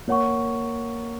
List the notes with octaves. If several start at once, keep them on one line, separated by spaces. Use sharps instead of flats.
A#3 C#5 F#5 C#6